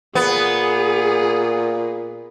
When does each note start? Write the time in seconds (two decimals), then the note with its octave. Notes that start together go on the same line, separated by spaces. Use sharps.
0.15 A#2 B3 G#4